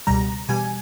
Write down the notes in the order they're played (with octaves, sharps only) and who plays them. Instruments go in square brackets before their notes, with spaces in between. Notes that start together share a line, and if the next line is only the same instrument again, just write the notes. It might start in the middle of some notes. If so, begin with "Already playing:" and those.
[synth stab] C#2 B2 G3 A#5
E2 B2 G3 G#5